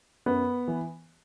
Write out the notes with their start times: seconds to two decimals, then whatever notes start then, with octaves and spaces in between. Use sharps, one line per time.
0.26 F#2 B3
0.68 E3